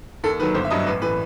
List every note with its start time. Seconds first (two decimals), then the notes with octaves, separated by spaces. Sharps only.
0.24 D#2 A4
0.40 D#3 B4
0.43 F#3
0.55 G1 C5
0.65 E5
0.70 G2 F#3 D#5
0.86 A1 B4
1.02 A2 E3 B4